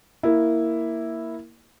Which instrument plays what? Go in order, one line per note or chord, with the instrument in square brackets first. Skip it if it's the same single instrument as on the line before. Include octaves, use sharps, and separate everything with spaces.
[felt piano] A#3 E4